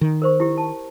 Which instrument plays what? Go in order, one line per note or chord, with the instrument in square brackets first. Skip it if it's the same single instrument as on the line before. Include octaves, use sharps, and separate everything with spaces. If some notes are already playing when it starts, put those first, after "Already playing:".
[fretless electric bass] D#3
[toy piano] A#4 C5 C#6
E4 G4
A5